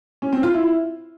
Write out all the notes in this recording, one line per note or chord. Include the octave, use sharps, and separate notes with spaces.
C#4
C4
F4
E4